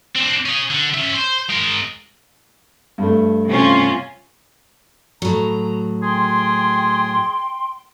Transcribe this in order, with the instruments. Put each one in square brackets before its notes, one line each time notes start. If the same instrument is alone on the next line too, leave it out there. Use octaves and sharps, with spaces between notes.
[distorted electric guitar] C4 D4
C#4 G#4
D3
C#4 E5
C5
G#3 A#4
[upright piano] G2 A3
[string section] C3 C#4 F4
[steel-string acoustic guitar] A2 F#3 [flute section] A#5
[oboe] G#4 [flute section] G5 C6